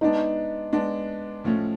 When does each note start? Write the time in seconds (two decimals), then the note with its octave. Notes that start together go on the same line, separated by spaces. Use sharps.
0.01 G#3 B3 D4 D#4
0.72 G#3 B3 D4
1.44 A2 F3 A3 C#4